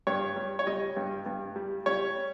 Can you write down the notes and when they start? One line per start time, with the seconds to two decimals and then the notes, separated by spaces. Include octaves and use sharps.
0.07 G2 C#5
0.36 G3
0.59 C#5
0.67 G3 D#5
0.97 G2
1.26 G2
1.56 G3
1.86 G3 C#5